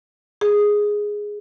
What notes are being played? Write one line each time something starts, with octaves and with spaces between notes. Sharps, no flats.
G#4